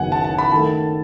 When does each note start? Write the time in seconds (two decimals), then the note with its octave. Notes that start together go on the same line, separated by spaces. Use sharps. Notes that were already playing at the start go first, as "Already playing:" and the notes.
Already playing: F#1 F#2 D#3 F#3 B3 F#5 G#5
0.12 A5
0.24 A5
0.38 B5
0.51 D#3 A3 A5